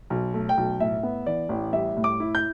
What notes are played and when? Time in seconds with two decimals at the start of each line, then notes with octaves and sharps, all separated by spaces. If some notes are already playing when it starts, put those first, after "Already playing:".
0.10 B1
0.34 A3
0.49 G5
0.57 B1
0.80 A2 E5
1.03 B3
1.27 E3 D5
1.49 A1
1.73 G3 E5
1.97 A2
2.04 D6
2.20 E4
2.35 G6